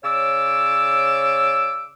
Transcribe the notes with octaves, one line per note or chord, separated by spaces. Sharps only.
C#3 C#5 D5 D6 E6